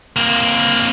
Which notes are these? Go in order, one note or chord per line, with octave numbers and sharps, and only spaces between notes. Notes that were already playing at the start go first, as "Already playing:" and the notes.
A#3 C4